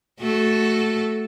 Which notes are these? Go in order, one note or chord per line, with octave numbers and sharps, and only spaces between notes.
A3 F#4 A4